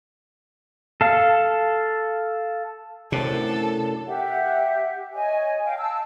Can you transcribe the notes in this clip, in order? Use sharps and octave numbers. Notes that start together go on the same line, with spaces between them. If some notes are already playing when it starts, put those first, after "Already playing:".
A4 F5
F#2 A2 C3 D4 A4
G4 E5 F#5
C#5 D#5 G#5
F5 G5
F5 A5 E6